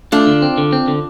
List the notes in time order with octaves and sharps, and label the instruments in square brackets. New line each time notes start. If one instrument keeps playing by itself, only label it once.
[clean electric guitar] A3 [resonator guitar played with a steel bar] D4 F4
[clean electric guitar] D3
C4
D3
C4
D3